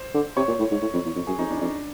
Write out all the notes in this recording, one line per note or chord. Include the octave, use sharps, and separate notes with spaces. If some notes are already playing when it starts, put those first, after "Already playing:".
Already playing: C5
D3
C3 C#5
A#2
A2
G#2
A2
F2
E2
F2
F#2 G#4
F2 D#4
E2 D4
C#4
F2 D4